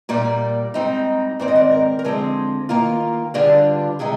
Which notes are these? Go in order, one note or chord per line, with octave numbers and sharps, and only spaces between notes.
A#2 G3 A#3 D5
G#2 G3 C4 D#4
G#2 D#3 G#3 C4 D5
D#5
D5
A#4
A#4
D3 F3 G#3 C4 G#4
D#3 A#3 F4
G2 D3 G3 D4 F4 G#4
C3 D#3 G#3 G#4